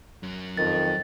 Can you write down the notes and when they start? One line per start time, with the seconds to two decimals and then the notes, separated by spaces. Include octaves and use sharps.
0.23 F#2 F#3
0.57 F2 D#3 A6